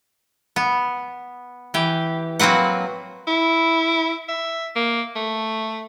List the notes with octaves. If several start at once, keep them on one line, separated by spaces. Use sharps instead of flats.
B3
E3 G4
F#3 A#3 C4 B4 F#5
E4
E5
A#3
A3